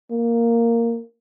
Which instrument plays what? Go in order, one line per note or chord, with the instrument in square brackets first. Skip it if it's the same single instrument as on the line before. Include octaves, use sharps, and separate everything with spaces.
[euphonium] A#3